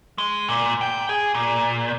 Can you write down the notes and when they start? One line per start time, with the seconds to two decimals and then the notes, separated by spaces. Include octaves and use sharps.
0.18 G#3
0.49 A#2
0.81 G5
1.09 G#4
1.34 A#2